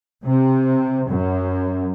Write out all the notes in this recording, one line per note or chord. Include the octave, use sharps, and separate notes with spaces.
C3
F#2